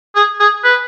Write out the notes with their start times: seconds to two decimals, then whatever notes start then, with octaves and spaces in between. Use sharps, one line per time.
0.15 G#4
0.40 G#4
0.64 B4